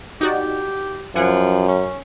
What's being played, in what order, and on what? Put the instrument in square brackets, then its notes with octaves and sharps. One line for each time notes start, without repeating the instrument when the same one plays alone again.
[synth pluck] D#4 F#4 D5 [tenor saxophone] G4
[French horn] F#2 [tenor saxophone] F3 [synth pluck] F#5 G#5
[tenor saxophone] C#4